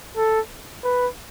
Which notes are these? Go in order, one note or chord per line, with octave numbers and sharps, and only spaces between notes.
A4
B4